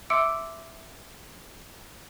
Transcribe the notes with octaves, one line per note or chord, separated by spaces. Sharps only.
E5 C6 D6 E6 C#7 D7